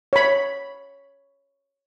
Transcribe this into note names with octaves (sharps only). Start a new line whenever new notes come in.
C#5 B5